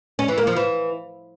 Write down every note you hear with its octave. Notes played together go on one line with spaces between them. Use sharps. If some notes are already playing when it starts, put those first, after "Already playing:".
C#4
E3
A#3
F3
E3